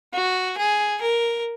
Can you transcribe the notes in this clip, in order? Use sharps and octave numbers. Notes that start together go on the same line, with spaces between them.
F#4
G#4
A#4